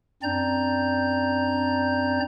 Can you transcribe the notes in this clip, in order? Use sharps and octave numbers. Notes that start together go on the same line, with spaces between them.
F#2 C4 D4 D5 A#5 G6